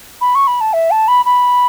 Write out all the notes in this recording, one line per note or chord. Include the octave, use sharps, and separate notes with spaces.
B5
C#6
B5
A5
E5
A5
B5
B5